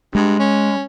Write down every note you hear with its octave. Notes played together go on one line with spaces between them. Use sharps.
G2 G#3
C#4